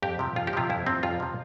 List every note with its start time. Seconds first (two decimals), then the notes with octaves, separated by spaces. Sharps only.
0.02 F2 G4
0.19 C3 F3
0.36 F2 F4
0.47 G4
0.53 C3 F3 F4
0.70 F2 E4
0.86 C3 F3 C4
1.03 F2 F4
1.20 C3 F3